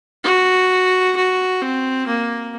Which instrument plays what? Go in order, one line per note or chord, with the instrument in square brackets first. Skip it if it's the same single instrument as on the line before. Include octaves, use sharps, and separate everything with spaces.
[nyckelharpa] F#4
F#4
C4
A#3